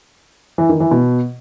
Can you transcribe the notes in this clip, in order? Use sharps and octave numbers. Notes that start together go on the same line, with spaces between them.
E3
D#3
E3
B2